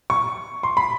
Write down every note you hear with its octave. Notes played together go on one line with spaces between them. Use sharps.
C#6
C6
B5